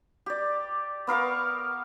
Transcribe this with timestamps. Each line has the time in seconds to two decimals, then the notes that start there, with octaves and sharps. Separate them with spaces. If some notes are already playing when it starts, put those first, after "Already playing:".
0.26 G4 D5
1.07 B3 A#4 F5 C#6